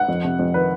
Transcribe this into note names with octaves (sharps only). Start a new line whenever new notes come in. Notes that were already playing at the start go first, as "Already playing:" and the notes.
Already playing: F#5
F2
C3
F2
D#3 B4